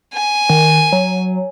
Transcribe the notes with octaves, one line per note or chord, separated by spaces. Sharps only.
G#5
D#3
F#3